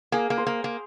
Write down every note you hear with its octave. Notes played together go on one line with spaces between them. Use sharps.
A#3 G#4
A#3
C5
A#3
A#3